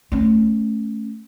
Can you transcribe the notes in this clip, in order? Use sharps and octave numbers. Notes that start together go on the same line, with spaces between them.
A3 C#4